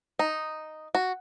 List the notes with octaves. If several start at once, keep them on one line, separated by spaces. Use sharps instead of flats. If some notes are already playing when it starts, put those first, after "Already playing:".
D#4
F#4